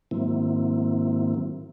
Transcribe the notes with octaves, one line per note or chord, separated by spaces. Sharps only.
G#2 D#3 F#3 A#3 C4 E4